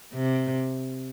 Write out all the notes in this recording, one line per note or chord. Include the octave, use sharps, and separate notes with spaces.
C3